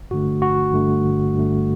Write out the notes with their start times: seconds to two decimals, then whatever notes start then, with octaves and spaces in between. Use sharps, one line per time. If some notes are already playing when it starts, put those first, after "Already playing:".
Already playing: G1
0.11 G2 D3 A3 F#4
0.42 G1 F#4
0.73 G2 D3 A3
1.04 G1
1.34 G2 D3 A3